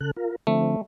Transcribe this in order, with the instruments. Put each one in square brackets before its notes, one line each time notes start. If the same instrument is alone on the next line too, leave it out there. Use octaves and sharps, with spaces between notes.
[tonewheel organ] C#3 A4 F#6
F4 A#4
[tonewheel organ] D3 F3 C4 [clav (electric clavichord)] A3